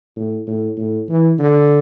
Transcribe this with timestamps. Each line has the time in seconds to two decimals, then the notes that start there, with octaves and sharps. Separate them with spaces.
0.16 A2
0.47 A2
0.77 A2
1.09 E3
1.39 D3